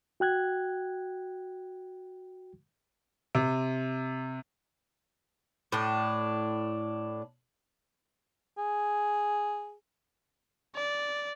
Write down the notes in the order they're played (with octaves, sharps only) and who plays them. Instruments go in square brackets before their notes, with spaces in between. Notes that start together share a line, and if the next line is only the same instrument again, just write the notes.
[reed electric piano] F#4 G5 F#6 G#6
[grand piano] C3
[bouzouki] A2 D4
[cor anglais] G#4
[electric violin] D5